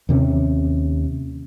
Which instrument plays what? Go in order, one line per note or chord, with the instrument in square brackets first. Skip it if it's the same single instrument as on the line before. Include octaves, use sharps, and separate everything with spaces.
[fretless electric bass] D#2 C3 G3 C#4